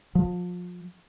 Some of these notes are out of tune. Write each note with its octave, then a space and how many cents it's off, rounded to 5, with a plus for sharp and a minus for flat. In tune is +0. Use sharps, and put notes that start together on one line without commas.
F3 +30